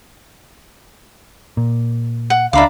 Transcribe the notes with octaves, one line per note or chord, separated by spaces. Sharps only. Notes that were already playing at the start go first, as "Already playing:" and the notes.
A#2
F#5
C#2 D4 E5 F5 A#5 B5 D6